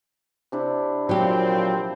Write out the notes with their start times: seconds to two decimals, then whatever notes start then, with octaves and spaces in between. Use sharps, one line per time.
0.52 C3 D4 E4
1.09 A#2 F3 F#3 C4 G4